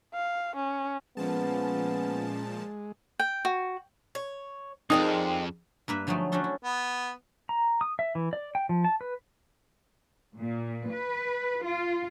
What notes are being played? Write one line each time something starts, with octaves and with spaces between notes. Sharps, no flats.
F5
C#4
A#2 F3 G#3 B3 C#4 A5
G5
F#4
C#5
F2 G#3 C4 D4 D#4 A#4 D5 D#6
G2 A#3 B4 E5
D3 F3 F#3 G#3 A3 D#4
F#3 C#4 D4 F#4 A4 C5
E4
B3
A#5
D#6
E5
E3
D5
G5
F3
A5
B4
A#2
B4
F4